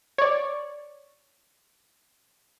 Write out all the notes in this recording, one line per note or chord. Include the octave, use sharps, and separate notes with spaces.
C#5 D5